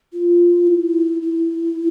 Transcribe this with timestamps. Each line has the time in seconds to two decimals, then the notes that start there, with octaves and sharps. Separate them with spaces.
0.13 F4
0.67 E4
1.22 E4